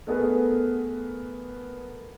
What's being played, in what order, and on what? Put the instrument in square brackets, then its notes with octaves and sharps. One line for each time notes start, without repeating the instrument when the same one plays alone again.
[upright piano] A3 B3 G#4 A#4 B4